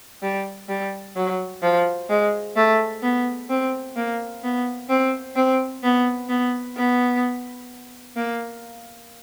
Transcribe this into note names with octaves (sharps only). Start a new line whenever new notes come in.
G3
G3
F#3
F3
G#3
A3
B3
C4
A#3
B3
C4
C4
B3
B3
B3
A#3